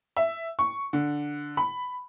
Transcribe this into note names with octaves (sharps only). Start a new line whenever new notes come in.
E5
C#6
D3
B5